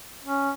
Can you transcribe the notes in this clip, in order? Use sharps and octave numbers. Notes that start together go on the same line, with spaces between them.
C#4